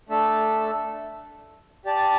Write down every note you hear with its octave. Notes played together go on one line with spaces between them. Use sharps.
A3 D4 A4 E5
G4 D5 A5